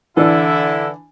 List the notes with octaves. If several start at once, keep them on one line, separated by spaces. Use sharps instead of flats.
D3 E3 D4 E4